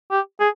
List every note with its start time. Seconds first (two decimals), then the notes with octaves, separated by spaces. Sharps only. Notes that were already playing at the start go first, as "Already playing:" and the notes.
0.11 G4
0.40 G#4